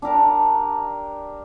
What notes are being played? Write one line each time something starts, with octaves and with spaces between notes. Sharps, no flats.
D4 G4 A#4 A5